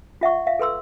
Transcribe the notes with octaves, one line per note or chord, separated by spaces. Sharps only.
F4 E5 F#5 C#6
E5 F5
A4 B4 C6 E6